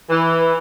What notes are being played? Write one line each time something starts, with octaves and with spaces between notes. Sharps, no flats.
E3